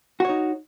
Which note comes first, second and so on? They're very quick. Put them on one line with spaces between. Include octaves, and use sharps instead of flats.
F#4 C#5 D#4